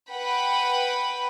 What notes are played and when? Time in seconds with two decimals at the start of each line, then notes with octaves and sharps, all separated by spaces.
0.12 B4 F#5 G5 B5